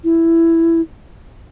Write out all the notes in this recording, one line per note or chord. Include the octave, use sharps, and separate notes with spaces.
E4